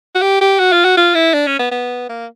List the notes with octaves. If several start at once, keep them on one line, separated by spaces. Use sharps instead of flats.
F#4
G4
G4
F#4
F4
F#4
F4
E4
D4
C#4
B3
B3
A#3